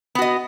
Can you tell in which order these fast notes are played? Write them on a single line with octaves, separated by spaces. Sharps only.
B3 F#4 D#5